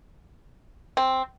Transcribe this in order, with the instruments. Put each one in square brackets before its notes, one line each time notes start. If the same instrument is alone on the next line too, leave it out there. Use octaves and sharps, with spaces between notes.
[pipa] C4